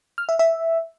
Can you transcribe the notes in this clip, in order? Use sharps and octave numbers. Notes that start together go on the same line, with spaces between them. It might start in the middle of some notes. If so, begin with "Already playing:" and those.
F6
E5
E5